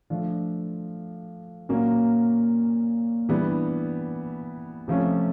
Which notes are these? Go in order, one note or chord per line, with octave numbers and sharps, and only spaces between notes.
F3 A3 D4 F4
A#2 F#3 A#3 C#4
E3 G3 B3 D4
C3 F3 A3 C#4